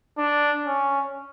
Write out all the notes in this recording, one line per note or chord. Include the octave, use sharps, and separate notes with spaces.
D4
C#4